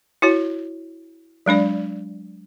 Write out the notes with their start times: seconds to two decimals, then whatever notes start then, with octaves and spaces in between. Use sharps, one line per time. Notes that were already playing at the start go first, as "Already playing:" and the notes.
0.22 E4 F#4 C#5
1.46 F#3 G#3 D4 D5